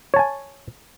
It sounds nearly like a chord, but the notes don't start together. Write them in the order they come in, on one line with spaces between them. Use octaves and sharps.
C#5 A5 G#5